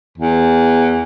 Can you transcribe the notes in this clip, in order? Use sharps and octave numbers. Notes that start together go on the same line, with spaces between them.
E2